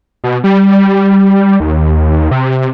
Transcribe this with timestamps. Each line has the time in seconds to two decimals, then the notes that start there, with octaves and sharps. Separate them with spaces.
0.24 B2
0.44 G3
1.60 D#2
2.31 C3